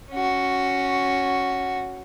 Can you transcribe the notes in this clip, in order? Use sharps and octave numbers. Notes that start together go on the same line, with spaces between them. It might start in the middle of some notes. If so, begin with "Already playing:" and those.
C#4 F#4